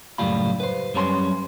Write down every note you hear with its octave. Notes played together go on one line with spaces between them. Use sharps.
C#2 F#2 A2 G3 F4 B5
B4 C5
F#2 G3 C#4 A#5 C6